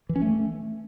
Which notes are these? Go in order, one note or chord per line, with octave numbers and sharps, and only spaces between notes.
E3
C#4
A3